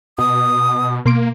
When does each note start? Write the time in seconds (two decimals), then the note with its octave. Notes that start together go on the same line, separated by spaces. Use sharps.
0.18 B2 D#6
1.06 B2 A#3 C6 D7